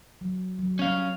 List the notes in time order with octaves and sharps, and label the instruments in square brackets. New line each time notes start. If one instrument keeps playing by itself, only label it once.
[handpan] F#3
F#3
[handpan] F#3 G3 [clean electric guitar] C#4 F5